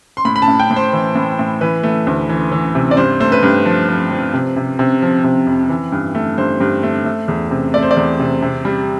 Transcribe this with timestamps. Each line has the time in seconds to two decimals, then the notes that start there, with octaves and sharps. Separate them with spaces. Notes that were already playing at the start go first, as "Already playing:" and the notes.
0.17 C6
0.25 A2 B5
0.36 B5
0.42 A5
0.48 A2
0.59 G5
0.71 A2
0.76 C5
0.93 E3
1.16 A2
1.39 A2
1.61 E3 B4
1.83 A3
2.07 D2
2.29 E3
2.52 E3
2.75 C3
2.91 D5
2.97 G2 C5
3.20 A3 C5
3.32 B4
3.43 G2
3.66 F3
3.89 F3
4.11 F3
4.34 C3
4.56 C3
4.79 C3
5.02 F3
5.24 C3
5.47 F2
5.70 E3
5.92 G2
6.15 A3
6.38 G2 C5
6.61 G2
6.83 A3
7.05 A3
7.28 E2
7.51 C3
7.74 A3 D5
7.83 C5
7.91 D5
7.97 E2
8.20 C3
8.42 C3
8.65 G3